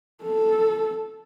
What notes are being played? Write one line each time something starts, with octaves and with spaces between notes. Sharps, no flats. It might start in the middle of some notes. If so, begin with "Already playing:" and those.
A4